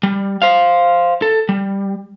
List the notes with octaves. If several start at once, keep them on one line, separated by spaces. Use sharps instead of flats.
G3
C5 F5
A4
G3